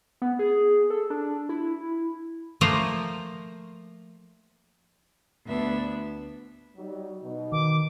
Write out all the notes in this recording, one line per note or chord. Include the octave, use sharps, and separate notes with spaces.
B3
G#4
A4
D4
E4
F3 A3 A#3 F4 C5 A#5
D2 B3 D4 E5
F#3 G3 D#4
B2 D#4
D#3 D6